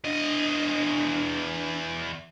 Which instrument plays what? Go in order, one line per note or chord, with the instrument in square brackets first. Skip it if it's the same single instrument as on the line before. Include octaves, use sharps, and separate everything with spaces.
[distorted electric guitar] E2 D#5 [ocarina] D4